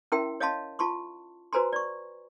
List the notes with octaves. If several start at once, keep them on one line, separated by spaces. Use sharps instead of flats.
C#4 E4 A#4 E5 G5 C6
C#5 D#5 F5 A5 C6
F4 A5 C6 C#6
F#4 B4 C5 G#5 A#5 C6
D5 C#6